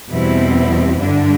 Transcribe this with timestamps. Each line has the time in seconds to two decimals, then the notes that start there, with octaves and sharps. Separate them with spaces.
0.11 E2 B2 G3 C4 E4
1.01 G2 D3 G3 D4